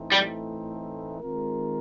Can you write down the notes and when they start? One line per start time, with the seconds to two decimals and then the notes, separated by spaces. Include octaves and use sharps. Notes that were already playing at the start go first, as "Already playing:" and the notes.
Already playing: A2 E3 A3 C4 D#4
0.12 G3
1.21 D#3 G#3 C4 F4 A#4